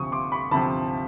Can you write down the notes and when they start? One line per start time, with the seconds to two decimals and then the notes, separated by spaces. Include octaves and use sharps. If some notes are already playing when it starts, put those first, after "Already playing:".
Already playing: D2 C3 F3 C#6 D#6
0.12 C6 D6
0.32 B5 C#6
0.51 D2 C3 F3 A5 B5